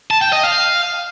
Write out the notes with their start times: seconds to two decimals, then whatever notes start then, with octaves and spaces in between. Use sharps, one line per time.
0.11 A5
0.22 G5
0.32 D#5
0.43 F5